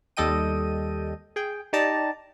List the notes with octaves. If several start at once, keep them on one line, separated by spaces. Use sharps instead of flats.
D#2 G3 A4 D#5 G5 D#7
G#4 G5
D#4 G4 D5 A5 A#5